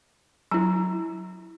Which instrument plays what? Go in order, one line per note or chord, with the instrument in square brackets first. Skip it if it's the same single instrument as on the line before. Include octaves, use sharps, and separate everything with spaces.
[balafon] F#3 [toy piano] E4 A#5